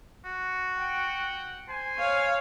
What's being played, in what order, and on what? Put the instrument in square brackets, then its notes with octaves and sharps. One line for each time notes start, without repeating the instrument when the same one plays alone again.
[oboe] F#4
[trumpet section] F#5 G5
[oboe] C5 [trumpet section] G#5
[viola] C#5 F5